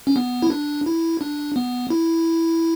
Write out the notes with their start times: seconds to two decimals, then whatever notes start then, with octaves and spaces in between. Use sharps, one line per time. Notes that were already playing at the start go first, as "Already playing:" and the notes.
0.07 C#4
0.16 B3
0.42 E4
0.50 D4
0.86 E4
1.21 D4
1.56 B3
1.90 E4